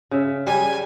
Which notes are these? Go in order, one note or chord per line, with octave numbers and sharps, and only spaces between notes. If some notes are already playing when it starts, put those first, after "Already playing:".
C#3 E5
G3 G#5